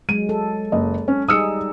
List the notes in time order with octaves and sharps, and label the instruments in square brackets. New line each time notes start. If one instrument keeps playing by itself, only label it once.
[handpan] F#3 G#3 [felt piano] D#7
[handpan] A4
[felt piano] F#1 D#5
C#4
[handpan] G3 D#4 G#4 [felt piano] D#6 E6 C#7